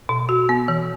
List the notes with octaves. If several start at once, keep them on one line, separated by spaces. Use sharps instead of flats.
B2
F#4
B3
E3